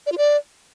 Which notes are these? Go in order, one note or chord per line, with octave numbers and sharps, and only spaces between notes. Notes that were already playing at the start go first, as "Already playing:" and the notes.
D5
F4
D5